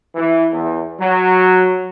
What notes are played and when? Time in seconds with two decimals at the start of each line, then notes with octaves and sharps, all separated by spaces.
0.15 E3
0.52 E2
1.00 F#3